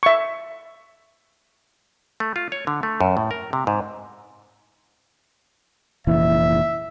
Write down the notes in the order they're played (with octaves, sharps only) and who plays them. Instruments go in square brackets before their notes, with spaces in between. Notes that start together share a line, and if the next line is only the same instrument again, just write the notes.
[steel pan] E5 C#6
[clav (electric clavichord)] A3
F4
C#5
D3
A3
F#2
A2
A#4
C3
G#2
[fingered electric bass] F1 A#2 E3 [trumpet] E5